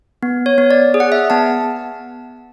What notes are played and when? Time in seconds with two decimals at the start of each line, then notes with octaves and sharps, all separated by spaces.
0.23 B3
0.46 C#5
0.58 B3
0.71 D5
0.94 G#4
1.00 F#5
1.12 E5
1.30 B3 A5